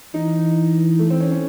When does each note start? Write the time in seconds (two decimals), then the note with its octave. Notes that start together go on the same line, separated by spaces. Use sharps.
0.14 E3 D#4
0.99 A3
1.10 C4
1.20 C#4
1.32 C#4